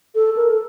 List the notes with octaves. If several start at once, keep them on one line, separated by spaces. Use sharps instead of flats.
A4
A#4
A4